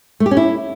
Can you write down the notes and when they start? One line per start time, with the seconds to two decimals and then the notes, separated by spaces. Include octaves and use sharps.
0.20 A3
0.26 G4
0.31 C#4
0.37 E4